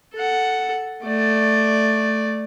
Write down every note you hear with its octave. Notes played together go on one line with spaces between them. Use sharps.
A4 F#5
A3 D5